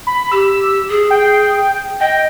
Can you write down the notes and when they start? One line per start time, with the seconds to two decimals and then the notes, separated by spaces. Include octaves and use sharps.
0.07 B5
0.32 G4 E6
0.90 G#4
1.10 G5
2.01 D#5 G5